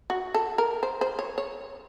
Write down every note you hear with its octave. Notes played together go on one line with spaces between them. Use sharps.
F#4
A4
A#4
C5
C5
C#5
C#5